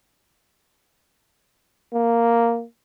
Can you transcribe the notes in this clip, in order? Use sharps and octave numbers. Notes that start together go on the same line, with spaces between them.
A#3